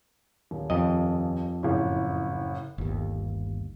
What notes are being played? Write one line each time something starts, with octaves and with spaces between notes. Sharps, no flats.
D#1
F2 D#5
F#1 A2
G1 D#2